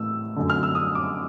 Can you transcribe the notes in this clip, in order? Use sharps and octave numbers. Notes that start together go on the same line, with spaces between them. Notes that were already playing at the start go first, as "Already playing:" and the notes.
Already playing: A2 E3 E6
F#2 D3
F6
E6
D#6
D6